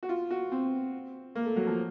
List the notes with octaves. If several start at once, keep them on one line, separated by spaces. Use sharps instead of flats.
F#4
F4
F#4
C4
A#3
A3
F#3
F3